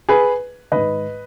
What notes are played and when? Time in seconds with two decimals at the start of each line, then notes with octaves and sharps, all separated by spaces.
0.09 G#4 B4
0.72 G#2 D#3 B4 D#5